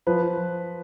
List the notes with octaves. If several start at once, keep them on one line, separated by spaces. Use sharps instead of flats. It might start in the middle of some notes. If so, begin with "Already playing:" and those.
F3 B4